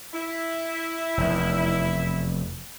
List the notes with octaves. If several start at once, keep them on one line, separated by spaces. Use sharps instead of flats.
E4
F1 E2